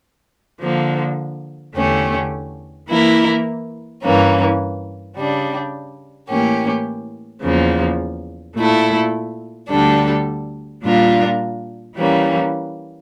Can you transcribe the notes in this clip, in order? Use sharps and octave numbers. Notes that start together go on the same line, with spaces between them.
D3 F3 A#3
E2 D3 A3 C#4 G4
E3 A#3 E4 A#4
G2 E3 A#3 C#4
C#3 G3 D4
A2 E3 A#3 C#4 G4
E2 C#3 F3 A#3
A#2 A3 E4 A4
D2 D3 G3 D4 A4
A#2 G3 D4 F4 A#4
E3 G3 A#3 C#4